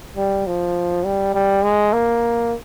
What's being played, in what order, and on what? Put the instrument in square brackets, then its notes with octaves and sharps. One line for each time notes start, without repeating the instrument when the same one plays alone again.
[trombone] G3
F3
G3
G3
G#3
A#3